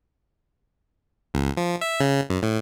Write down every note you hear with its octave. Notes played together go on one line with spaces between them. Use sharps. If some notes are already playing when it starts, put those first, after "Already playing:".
C#2
F3
E5
C#3
F#2
A2